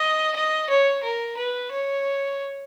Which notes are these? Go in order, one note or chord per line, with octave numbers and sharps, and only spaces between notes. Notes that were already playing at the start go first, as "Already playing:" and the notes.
Already playing: D#5
D#5
C#5
A#4
B4
C#5